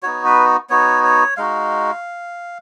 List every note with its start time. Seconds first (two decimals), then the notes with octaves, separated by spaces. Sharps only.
0.03 B3 D#4 F#4 C#5
0.25 B4
0.70 B3 D#4 F#4 C#5
1.04 C#5
1.37 G#3 D#4 F#4 F5